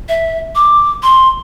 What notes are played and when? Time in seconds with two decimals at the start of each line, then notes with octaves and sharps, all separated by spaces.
0.09 E5
0.55 D6
1.03 C6